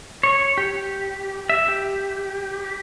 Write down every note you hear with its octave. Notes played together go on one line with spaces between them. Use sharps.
C#5
G4
E5
G4